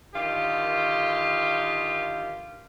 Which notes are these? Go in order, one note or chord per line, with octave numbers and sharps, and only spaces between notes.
D3 D#3 F4 G4